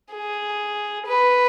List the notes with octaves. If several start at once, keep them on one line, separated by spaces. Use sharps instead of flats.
G#4
B4